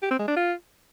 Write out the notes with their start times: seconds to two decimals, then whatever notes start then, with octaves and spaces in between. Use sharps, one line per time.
0.02 G4
0.11 C4
0.19 G#3
0.28 D4
0.36 F4